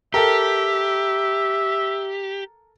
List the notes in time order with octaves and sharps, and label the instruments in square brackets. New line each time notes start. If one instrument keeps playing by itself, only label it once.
[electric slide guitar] G4 [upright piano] A4 A#4 [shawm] E5